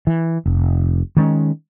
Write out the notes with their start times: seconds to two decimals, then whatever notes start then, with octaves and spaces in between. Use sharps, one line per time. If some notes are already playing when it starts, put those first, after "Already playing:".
0.07 E3
0.46 F1
1.17 D#3 G#3 C#4